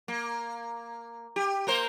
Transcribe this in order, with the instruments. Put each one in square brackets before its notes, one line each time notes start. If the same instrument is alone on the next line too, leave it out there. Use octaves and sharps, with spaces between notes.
[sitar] A#3
G4
A#3 A#4 C5